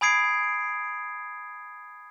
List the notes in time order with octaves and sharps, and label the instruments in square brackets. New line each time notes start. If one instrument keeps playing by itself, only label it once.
[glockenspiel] G#5 B5 D#6 G#6 C7 D7